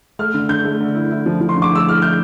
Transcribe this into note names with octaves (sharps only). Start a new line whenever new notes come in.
A3 F6
D3
D3 G6
A3
D3
E4
E4
F3
F3
C6
D3
D6
A3 E6
E4 F6
E4 G6